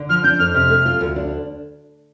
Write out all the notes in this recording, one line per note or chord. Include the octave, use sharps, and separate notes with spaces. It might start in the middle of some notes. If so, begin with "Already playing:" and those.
Already playing: D3
F3 F6
D4 G6
F2 F6
C3 F6
A3
F4
D2
D4